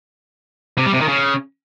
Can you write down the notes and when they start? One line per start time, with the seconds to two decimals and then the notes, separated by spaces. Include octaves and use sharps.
0.78 C3
0.86 G3
0.93 C3
1.01 D#3
1.08 C#3